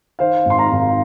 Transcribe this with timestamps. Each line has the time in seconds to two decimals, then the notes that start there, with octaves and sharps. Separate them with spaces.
0.19 D#3 C5 F5
0.45 G#1 C6
0.58 F5 A#5
0.71 G#1